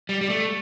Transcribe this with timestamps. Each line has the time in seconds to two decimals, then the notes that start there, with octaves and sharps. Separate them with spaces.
0.09 G3
0.21 G3
0.30 A3